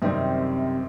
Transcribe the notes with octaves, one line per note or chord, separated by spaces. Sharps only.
F#2 C3 D#3 G3 C4